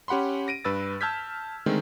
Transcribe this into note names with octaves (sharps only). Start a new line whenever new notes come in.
C#4 G4 F#5 B5 C6
A#6 D7 D#7
G2 B4 E6 A6
A5 E6 F6 G6 G#6 B6
D3 D#3 G#3 A3 C4